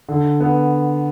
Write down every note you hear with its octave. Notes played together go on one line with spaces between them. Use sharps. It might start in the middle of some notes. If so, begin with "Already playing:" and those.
D3
B3